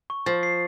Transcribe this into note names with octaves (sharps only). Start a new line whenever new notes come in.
C#6
F3 A6
C7